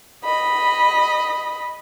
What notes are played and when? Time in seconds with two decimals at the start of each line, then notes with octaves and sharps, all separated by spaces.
0.24 D#5 B5